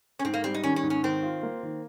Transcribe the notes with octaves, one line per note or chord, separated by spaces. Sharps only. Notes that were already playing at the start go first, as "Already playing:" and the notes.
C#4
G#2 C4
A#3
G3 C4
D#4
D#3 C#4
C#4
G#2
C#4
D#3 C4
F4
A#3
D#3